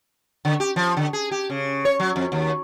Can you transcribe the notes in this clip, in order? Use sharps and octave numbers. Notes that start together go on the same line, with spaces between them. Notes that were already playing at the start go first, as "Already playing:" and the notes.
D3
G4
F3
D3
G#4
G4
C#3
C#5
F#3
F2
D#2